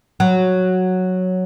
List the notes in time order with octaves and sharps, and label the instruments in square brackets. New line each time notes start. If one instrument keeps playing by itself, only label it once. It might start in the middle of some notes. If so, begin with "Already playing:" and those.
[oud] F#3